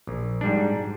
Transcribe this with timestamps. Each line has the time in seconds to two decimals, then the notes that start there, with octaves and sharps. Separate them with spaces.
0.07 A#1
0.41 G#2 G3 D4